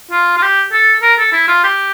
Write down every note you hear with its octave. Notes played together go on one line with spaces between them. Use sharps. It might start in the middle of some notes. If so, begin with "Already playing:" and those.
F4
F4
G4
A4
A#4
A4
E4
F4
G4